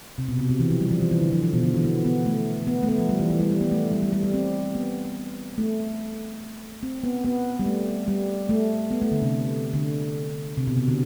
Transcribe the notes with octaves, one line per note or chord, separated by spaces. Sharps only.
C3
B2
C3
C3
E3
F3
G3
F3
E3
E3
D3
F3
F3
B2
D3
E3
B3
B3
A3
B3
A3
B3
F3
G3
E3
E3
G3
G3
B3
A3
G3
G3
G3
G3
C4
B3
A3
C4
B3
B3
G3
A3
G3
A3
B3
A3
D3
C3
D3
C3
B2
C3
D3